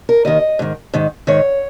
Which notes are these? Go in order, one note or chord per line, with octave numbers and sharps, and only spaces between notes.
A#4
D#2 D#3 D#5
G#2 D#3
G#2 D#3
G#2 D#3 C#5